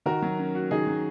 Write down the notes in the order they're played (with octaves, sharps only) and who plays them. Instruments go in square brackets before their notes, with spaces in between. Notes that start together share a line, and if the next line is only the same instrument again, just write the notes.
[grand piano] D#3 [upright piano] F#4 A#4
[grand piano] F#3
C#4
F#4
[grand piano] D#3 [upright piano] D#4 G#4
[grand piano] F#3